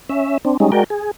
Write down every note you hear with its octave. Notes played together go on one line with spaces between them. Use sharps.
C#4 E5
C4 D4
G3 G#3 C#4 D#4
G#3 F#4 A#4 D5 G5
G#4